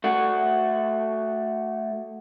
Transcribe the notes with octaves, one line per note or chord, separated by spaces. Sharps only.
A3 F#4